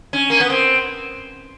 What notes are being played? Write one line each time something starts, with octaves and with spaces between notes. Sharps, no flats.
C#4
A#3
B3
C4